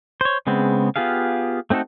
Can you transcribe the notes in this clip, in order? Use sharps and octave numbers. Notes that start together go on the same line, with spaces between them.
C5 C#5
C#3 G#3 B3 C4
B3 F4 G4 G#4 F5
A3 C4 D#4 F#4 A4